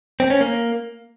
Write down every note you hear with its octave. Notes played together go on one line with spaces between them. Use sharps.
C4
C#4
A#3